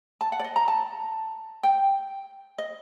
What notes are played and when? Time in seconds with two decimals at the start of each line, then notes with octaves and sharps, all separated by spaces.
0.21 A5
0.32 F#5
0.39 D5
0.44 D#5
0.56 A#5
0.68 A5
1.63 G5
2.58 D#5